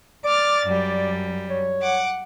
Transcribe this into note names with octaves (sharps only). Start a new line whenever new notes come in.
D5 D6 F6 A6
F#2 G3
C#5
F#5 D6